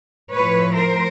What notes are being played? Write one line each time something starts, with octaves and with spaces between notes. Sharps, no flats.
A2 F3 B4 C#5
A#4 C5